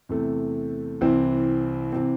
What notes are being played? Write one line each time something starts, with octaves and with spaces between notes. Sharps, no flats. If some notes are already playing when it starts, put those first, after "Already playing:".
E2 C3 A3
C2 C3 E3 C4
C3 E3 C4